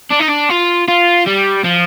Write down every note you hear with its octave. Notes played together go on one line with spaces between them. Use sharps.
D4
D#4
D4
F4
F4
G3
F3